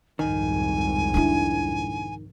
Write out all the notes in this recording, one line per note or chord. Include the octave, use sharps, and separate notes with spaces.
C2 F2 G#2 D#3 G#5
D4 E4